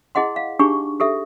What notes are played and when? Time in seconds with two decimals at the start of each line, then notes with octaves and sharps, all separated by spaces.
0.15 E4 G#4 D#5 F#5 C6
0.36 F5
0.59 D4 D#4 G4 G#4 C#6
1.00 G4 A4 E5